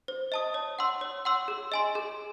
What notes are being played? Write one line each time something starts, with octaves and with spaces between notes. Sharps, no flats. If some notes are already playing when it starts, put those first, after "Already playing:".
C5
D#5 A5 D#6
C#5
F#5 C6 E6
C#5
F#5 C6 E6
G#4
D#5 G#5 C6
G#4